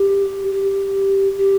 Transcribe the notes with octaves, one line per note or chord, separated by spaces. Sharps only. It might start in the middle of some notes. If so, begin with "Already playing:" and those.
Already playing: G4
G4
G4